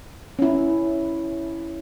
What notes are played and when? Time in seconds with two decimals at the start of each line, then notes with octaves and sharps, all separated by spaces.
0.39 C#4 E4